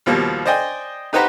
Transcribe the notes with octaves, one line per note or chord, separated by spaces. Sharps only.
D#2 B2 F3 G3 A#3
C5 D5 D#5 G5 G#5
D#4 G4 B4 C5 F#5 A#5